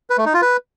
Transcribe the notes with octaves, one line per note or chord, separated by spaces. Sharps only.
B4
A3
D#4
F4
B4